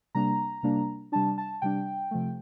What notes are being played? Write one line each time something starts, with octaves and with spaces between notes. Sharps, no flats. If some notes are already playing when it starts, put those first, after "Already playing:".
C3 G3 A#3 D4 A#5
C3 G3 A#3 D4
C3 G3 D4 A5
A5
C3 G3 D4 G5
C3 F3 A3